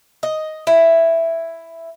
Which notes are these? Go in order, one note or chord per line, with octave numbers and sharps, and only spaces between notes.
D#5
E4